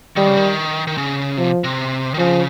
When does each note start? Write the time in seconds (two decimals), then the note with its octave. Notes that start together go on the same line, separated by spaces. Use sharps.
0.16 D#3 G3
0.27 C#3
0.37 D#3
0.87 D#3
0.98 C#3
1.37 C3 F3
1.64 C3
2.14 D#3
2.18 C#3 F3